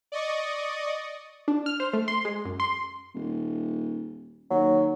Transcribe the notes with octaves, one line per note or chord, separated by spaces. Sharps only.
D5 D#5 C#6 D#6
D4
F6
C5
A3
C6
G#3
F#2
C6
D#1
D#2 F#3